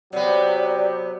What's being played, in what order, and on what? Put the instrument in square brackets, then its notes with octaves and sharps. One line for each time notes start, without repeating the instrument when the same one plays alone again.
[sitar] C3 B3 [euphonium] F#3 [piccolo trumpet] G4 [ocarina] D5